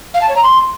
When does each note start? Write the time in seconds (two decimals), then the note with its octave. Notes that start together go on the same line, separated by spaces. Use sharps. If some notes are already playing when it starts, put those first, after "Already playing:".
0.14 F5
0.21 A5
0.28 C#5
0.35 A#5
0.43 C6